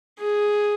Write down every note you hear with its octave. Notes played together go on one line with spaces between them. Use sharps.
G#4